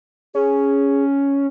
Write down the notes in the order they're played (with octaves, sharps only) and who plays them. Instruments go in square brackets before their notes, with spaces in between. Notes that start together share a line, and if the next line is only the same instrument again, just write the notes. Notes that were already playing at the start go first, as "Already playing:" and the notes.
[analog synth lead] C#4 [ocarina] G#4